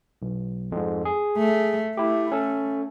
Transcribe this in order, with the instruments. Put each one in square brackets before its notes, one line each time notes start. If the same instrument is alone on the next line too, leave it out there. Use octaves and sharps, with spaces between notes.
[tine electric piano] B1
F2 G#2
G#4
[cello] A3
[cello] A3 [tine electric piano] E4 G4
[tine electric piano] C#4 A4